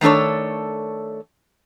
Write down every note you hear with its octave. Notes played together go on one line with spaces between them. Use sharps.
D#3 A3 D4 A4 C#5